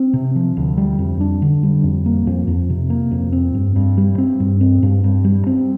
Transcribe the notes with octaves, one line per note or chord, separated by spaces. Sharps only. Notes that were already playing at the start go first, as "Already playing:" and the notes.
Already playing: C4
C3
F3
D2
G3
F2
D4
D3
G3
F2
A#3
F2
F2
C3
A#3
F2
C4
G2
G2
G3
C4
G2
C4
G2
G2
G3
C4